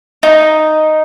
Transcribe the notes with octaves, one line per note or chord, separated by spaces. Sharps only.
D#4